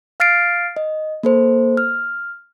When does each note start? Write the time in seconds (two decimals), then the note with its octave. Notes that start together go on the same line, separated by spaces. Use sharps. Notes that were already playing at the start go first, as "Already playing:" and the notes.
0.20 F5 F6 A6 C7 D7
0.77 D#5
1.23 A#3 A4 C5
1.77 F6